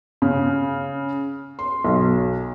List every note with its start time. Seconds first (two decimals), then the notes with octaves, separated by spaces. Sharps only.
0.22 C#3
1.59 C6
1.85 B1